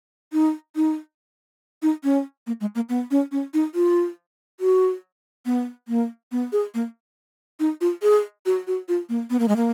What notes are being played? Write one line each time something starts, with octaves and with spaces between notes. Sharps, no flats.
D#4
D#4
D#4
C#4
A#3
G#3
A#3
B3
C#4
C#4
D#4
F4
F#4
B3
A#3
B3
G#4
A#3
D#4
F4
G#4
F#4
F#4
F4
A#3
B3
A#3
G#3
A#3